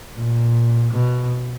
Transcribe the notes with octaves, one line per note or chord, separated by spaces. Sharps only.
A#2
B2